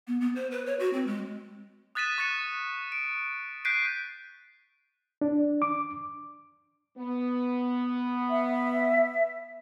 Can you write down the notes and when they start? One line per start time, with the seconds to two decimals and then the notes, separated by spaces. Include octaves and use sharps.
0.07 B3
0.21 B3
0.36 C5
0.51 B4
0.66 C#5
0.79 F#4
0.93 C4
1.07 G#3
1.95 D#6 F#6 A6 B6 D#7 E7
2.18 C#6 F#6 A6 C#7 E7
2.92 D7
3.65 F#6 G6 B6 C7 D7 D#7
5.21 D4
5.62 D6
6.98 B3
8.30 E5